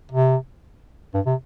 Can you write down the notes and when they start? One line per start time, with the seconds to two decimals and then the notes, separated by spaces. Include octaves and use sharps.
0.12 C3
1.14 G2
1.26 C3